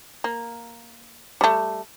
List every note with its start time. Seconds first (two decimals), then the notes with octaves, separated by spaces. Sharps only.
0.24 A#3
1.41 G3 A3